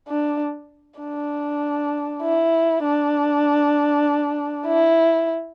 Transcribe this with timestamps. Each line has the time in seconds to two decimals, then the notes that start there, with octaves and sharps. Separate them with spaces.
0.08 D4
1.00 D4
2.22 E4
2.83 D4
4.66 E4